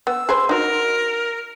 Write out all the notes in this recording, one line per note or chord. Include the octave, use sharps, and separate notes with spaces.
B3 E6
G#4 B4 C5
D#4 F#4 A#4